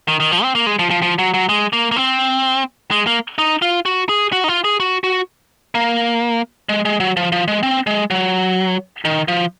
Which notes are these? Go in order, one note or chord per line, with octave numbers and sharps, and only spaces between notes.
D#3
D#3
F3
C4
A#3
G#3
F3
F3
F3
F#3
F#3
G#3
A#3
A#3
C4
G#3
A#3
D#4
F4
F#4
G#4
F#4
D#4
F4
G#4
F#4
F#4
A#3
G#3
G#3
F#3
F3
F3
G#3
C4
G#3
F#3
D#3
F3